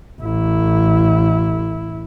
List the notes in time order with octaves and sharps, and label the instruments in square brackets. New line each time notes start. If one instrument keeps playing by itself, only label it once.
[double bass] A1 E4